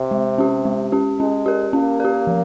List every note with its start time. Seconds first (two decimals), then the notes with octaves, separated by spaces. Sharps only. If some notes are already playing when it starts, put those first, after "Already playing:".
Already playing: C3
0.11 G#3
0.38 C#4 G4
0.65 G#3
0.92 C#4 G4
1.20 G#3 C#4
1.46 G4 A#4
1.73 A#3 C#4
2.00 G4 A#4
2.27 F3